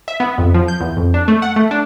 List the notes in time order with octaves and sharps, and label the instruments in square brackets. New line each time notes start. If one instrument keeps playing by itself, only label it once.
[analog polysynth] E5
B3
F2
F3
G6
E2
F2
D4
A3
F#5
A3
D4